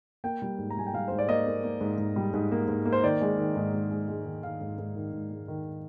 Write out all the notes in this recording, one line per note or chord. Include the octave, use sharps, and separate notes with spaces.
A#3 G5
G3
G#2
A#5
G3 G#5
G5
G3 F5
G#2 C5
D5
A#3 D#5
A#3
A#3
G#2
G#2
G3
G#2
A#3
G#2
A#3
C5
D#3 D5
G#3
D#3
G#2
G#3
G#3
G#3
D#3
D#3 F5
G#2
G#2
D#3
G#2
G#3
D#3